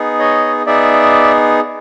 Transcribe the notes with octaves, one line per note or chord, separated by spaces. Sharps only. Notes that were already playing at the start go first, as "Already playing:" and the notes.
Already playing: B3 D#4 G#4
C#5 D#5
B3 D#4 G#4 D5 E5